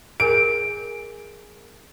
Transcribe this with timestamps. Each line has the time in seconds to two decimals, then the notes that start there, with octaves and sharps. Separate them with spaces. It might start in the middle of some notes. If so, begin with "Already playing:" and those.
0.20 G#4 A#4 G#5 D7